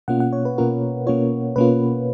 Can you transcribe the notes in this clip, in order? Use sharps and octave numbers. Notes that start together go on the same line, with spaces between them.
B2 A#3 C#4 F4 F#5
F#5
C#5
B4
B2 A#3 C#4 F4 A#4
B2 A#3 C#4 F4 C#5
B2 A#3 C#4 F4 B4